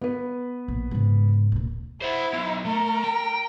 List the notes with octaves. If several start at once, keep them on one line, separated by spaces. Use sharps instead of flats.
B3 B4
A#1
G#2 C#3
D1 A#2
E4 C5 F#5
F#3 B3
A3 A#4
G5